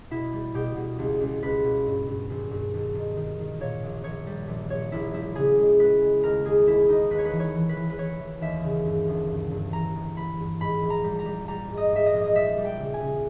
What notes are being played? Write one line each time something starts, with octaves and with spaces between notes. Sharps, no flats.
B2 E4
G3
B2 G4
B2
C#2
C#2
C#2 B4
B2
G2
G2
G#1
G2
G#1
D#3
D#3
D#3
A#2 C#5
A#1
A#1 C#5
G3
A#1
A#1 C#5
A#1 E4
G3 E4
C#3 G#4
G#3
G#3 B4
G#3
D#2 A#4
D#2 G#4
D#2 E4
D#2 D#4
D#2 B4
C#5
B4
E3
C#5
E3
B4
E3
B4
E3 C#5
E3
D#2 E5
C#3
G2
G1
G2
G2
E3 A#5
G1
E3 B5
G2
G#2 B5
A#1
A#5
G3
A#5
G3
G3 A#5
G#2
D#5
G#2 E5
D#5
A#1
D#5
G3 E5
G3
G5
C#3
G#5
C#3